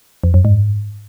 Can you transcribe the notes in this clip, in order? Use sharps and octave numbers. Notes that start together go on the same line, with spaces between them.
F2
F#2
G#2